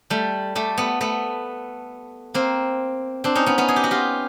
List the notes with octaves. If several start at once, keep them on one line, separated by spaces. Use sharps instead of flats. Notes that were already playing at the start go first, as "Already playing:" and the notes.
G3 A3
G3 A3
A3 B3
A3 B3
A#3 C4
C4 D4
C#4 D#4
B3 C#4
B3 C#4
G#4
G4
F#4
F4 G4